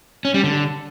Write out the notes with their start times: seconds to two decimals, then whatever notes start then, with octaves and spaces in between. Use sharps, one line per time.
0.25 C#4
0.34 G3
0.44 D3